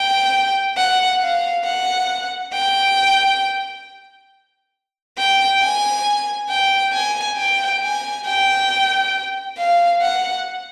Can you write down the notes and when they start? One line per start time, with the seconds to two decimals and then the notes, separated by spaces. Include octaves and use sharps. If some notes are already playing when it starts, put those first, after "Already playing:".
Already playing: G5
0.77 F#5
1.20 F5
1.64 F#5
2.53 G5
5.18 G5
5.61 G#5
6.50 G5
6.93 G#5
7.37 G5
7.82 G#5
8.26 G5
9.58 F5
10.02 F#5